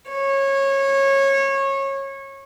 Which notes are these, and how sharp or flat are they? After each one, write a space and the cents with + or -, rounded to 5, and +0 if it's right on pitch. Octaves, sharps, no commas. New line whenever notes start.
C#5 -20